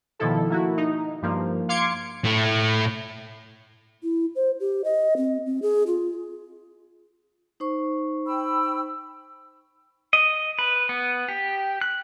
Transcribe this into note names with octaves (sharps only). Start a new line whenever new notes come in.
B2 D#3 F3 E4 A4
A#3 E4 F#4
D#4
G2 F3 A#3
F5 C6 D6 G#6 C#7
A2 A3
E4
C5
G4
D#5
C4
C4
G#4
F4
D#4 C5 C#6
G5 B5 E6
D#5
B4
B3
G4
F#6